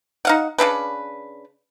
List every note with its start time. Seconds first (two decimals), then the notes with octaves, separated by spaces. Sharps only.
0.25 D#4 F5 F#5
0.58 C#3 G#3 D4 B4